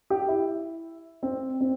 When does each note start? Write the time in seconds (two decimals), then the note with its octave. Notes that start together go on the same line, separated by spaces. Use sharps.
0.10 G4
0.28 E4
1.23 C4
1.61 C4